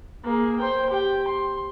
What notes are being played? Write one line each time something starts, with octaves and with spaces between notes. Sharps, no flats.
A#3 G#4
C5 G5
G4 G5
C6